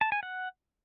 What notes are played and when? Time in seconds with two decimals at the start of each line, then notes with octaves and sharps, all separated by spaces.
0.01 A5
0.12 G#5
0.23 F#5